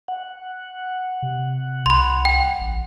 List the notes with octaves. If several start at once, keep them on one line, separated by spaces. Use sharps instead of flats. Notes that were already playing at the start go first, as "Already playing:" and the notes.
F#5
C3
C2 B5 C6
G5
A1